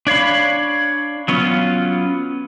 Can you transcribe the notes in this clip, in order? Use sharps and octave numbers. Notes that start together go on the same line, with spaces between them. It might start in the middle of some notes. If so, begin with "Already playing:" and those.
D4 C#5 F5 B5
F#3 B3 C#4 F4